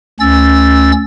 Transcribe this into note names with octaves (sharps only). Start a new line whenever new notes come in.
D2 C#4 E6 A6